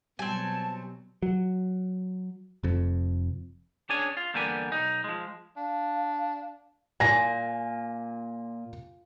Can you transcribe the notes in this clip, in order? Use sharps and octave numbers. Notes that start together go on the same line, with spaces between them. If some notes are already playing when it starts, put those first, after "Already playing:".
B2 F#3 G3 C4 G#5 A5
F#3
F1 F2
C#4 D4 G#4 C#5 G#5
F4
E2 D3 G3 A#3 B3 G#5
B1 D#4
F3 G#3
D4 F5
A#2 G#5 A#6